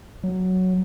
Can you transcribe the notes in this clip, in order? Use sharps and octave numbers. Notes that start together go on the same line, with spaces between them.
F#3